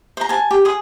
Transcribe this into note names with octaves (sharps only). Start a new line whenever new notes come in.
C5 A#5
G#5 A5
G4
G#4 D#6